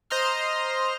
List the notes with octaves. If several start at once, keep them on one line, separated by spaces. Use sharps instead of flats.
C5 D#5 A#5 C6 F6